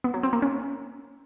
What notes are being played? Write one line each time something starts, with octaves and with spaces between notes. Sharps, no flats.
B3
F#3
C4
A#3
C#4